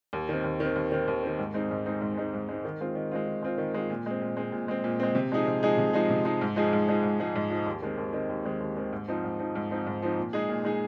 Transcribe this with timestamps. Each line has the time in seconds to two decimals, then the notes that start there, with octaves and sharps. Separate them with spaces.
0.13 D#2
0.29 D#3 C4
0.44 D#2
0.60 D#3 C4
0.76 D#2
0.92 D#3 C4
1.08 D#2
1.23 D#3 C4
1.39 G#2
1.54 G#3 C4 D#4
1.71 G#2
1.86 G#3 C4 D#4
2.01 G#2
2.17 G#3 C4 D#4
2.34 G#2
2.49 G#3 C4 D#4
2.65 D#3
2.81 G#3 C4 F4
2.95 D#3
3.11 G#3 C4 F4
3.27 D#3
3.43 G#3 C4 F4
3.58 D#3
3.74 G#3 C4 F4
3.90 A#2
4.06 G#3 C4
4.22 A#2
4.37 G#3 C4
4.52 A#2
4.68 G#3 C4
4.84 A#2
5.00 G#3 C4
5.15 C3
5.32 F3 G#3 D#4 G#4
5.47 C3
5.63 F3 G#3 D#4 G#4
5.78 C3
5.93 F3 G#3 D#4 G#4
6.10 C3
6.25 F3 G#3 D#4 G#4
6.41 G#2
6.56 F3 G#3 D#4 G#4
6.73 G#2
6.87 F3 G#3 D#4 G#4
7.03 G#2
7.20 F3 G#3 D#4 G#4
7.35 G#2
7.50 F3 G#3 D#4 G#4
7.66 D#2
7.82 D#3 G#3 C4
7.98 D#2
8.13 D#3 G#3 C4
8.29 D#2
8.45 D#3 G#3 C4
8.60 D#2
8.76 D#3 G#3 C4
8.93 G#2
9.08 F3 C4 D#4
9.24 G#2
9.39 F3 C4 D#4
9.55 G#2
9.70 F3 C4 D#4
9.86 G#2
10.02 F3 C4 D#4
10.18 A#2
10.33 G#3 D#4 G#4
10.49 A#2
10.65 G#3 D#4 G#4